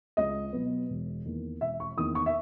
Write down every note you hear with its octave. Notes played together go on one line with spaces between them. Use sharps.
C#2 D#5
B2 F#3 B3
E1
E2 D#3 A#3
E1 E5
C#6
E2 D#3 A#3 D#6
C#6
E5